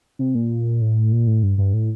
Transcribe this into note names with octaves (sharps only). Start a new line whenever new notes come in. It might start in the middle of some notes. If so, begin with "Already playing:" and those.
C3
A#2
A2
A#2
A2
G2
G2
A2